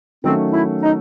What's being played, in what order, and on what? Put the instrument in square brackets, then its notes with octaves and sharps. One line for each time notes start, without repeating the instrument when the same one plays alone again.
[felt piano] D#3 F#3 A3 C#4 [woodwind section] C4
[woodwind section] E4
D#4